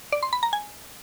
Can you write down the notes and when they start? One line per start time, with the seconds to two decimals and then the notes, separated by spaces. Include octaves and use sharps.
0.12 D5
0.23 C6
0.33 B5
0.43 A#5
0.53 G#5